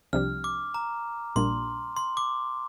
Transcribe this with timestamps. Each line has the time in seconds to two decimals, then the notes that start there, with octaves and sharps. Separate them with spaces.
0.13 C2 C3 F3 D4 G4 F6
0.44 D6
0.74 A#5
1.36 A#1 A#2 G3 A#3 D4 C6
1.96 C6
2.17 D6